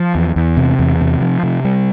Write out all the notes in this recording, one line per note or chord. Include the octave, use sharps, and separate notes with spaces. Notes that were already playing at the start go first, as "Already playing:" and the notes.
Already playing: F3
E2
E2
C3
E2
C3
F3
C3
G3